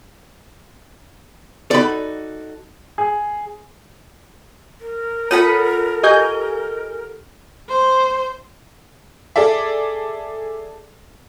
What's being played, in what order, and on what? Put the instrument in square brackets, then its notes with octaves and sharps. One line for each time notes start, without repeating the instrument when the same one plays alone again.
[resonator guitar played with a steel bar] D#4 F#4 A4 [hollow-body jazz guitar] D5 B5
[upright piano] G#4
[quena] A#4
[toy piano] F4 C#5 [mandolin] A4 F#5 B5 [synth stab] D#6
[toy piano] G4 [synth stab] D#5 G#5 G6
[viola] C5
[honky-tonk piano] G#4 A4 D5 E5